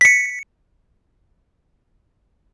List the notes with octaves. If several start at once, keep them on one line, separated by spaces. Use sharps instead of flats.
B6 C#7